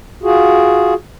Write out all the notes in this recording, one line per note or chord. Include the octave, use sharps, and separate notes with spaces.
F4 F#4 G#4